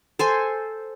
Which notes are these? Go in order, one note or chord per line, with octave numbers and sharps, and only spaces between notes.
A4 C5 G#5